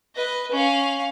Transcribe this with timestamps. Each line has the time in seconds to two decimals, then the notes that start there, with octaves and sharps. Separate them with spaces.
0.15 B4 D#5
0.51 C#4 F5